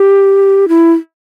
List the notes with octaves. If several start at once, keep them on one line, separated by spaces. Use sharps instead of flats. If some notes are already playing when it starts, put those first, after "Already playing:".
Already playing: G4
E4